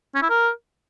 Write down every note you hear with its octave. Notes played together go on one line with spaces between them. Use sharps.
C#4
E4
A#4